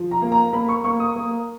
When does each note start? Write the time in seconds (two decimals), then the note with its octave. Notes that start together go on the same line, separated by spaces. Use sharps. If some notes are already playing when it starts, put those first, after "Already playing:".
Already playing: F3
0.11 A#5
0.22 A#3
0.32 A#5
0.53 A#3 B5
0.68 C#6
0.84 A#3 C#6
1.00 D#6
1.16 A#3